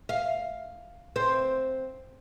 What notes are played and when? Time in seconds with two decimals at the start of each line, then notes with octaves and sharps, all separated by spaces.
0.09 F5
1.16 C4 C5